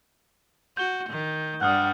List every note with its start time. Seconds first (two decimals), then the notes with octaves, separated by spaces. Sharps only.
0.77 F#4 G6 G7
1.10 D#3
1.61 G2 G3 F#5 D#6 F6 F#6